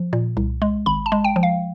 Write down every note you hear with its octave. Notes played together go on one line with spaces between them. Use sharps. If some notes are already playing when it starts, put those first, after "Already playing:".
Already playing: F3
A#2
C2
G#3
G#1 B5
A5
G#3
G5
F3
F5